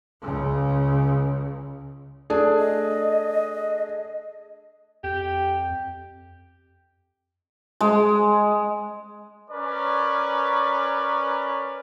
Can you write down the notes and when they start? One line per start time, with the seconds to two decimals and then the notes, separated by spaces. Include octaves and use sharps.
0.21 C#2 C#3
2.30 A3 D4 G#4
2.59 D#5
5.04 F2 G4
7.81 G#3
9.49 C#4 A#4 B4 C#5 D5